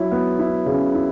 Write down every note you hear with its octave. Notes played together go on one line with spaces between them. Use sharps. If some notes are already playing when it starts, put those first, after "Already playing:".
Already playing: F#3 E4
B3
E4
C#3
E4